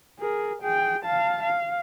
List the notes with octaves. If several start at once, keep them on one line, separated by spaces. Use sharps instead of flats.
G#4 A#4
G#4 G5
F5 A5
F5